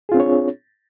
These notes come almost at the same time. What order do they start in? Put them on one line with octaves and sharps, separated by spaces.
G#4 F4 C4 D4 C#5